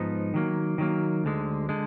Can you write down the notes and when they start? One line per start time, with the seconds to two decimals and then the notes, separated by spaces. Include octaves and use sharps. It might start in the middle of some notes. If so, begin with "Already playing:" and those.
Already playing: G#2 F3 B3 D#4
0.34 D#3 F#3 A#3
0.78 D#3 F#3 A#3
1.24 D2 D3 G#3
1.69 D3 G#3